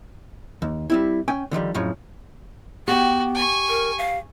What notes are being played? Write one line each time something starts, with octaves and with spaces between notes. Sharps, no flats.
D#2
G3 C4 E4
C#4 G5 G#5
D3 D#3 F3 G3
F2 A2 C#3 F3 F#3
B3 F#4 G4 G5
G#5 C#6
A#4
F5